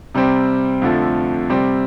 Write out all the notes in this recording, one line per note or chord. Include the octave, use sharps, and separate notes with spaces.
C3 G3 C4
F2 D3 F3 A3
C3 G3 C4